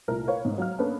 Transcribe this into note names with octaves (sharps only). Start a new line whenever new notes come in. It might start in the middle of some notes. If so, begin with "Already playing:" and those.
C2 A#2 A3 A#4 F6
A#4 B4 C#5 F5
G#2
F#3 F5 F6
A#3 B3 C#4 D4 A4 B4